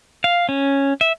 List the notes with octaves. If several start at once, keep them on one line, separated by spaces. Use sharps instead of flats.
F5
C#4
E5